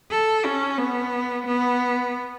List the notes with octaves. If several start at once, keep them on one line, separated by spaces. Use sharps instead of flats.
A4
C#4
B3
B3